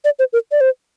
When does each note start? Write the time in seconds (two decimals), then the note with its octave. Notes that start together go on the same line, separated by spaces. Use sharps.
0.05 D5
0.19 C5
0.33 A#4
0.52 D5
0.61 C5